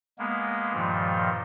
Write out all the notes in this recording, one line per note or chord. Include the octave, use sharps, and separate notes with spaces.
G#3 A#3 B3
G2 A#2 D#3 F3